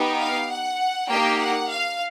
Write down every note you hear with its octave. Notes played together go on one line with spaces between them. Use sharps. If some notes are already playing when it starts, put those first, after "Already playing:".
Already playing: B3 D#4 G4
F5
F#5
A#3 D#4 G4 G5
F#5
F5